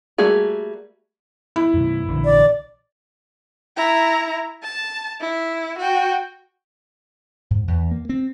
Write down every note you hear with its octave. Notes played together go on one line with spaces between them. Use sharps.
G3 A3 A#3 F#4 G#4
E4
F#2 B2
A#1 D3 E3
D5
E4 A#5
A5
E4
F#4 G5
G#2
E2
A#3
C4